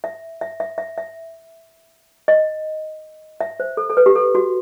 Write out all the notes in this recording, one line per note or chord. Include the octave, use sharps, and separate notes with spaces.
E5
E5
E5
E5
E5
D#5
E5
C5
A4
A4
B4
G4
A4
F#4